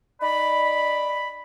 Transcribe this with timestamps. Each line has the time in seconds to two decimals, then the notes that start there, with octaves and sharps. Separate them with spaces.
0.21 D#4 D5 B5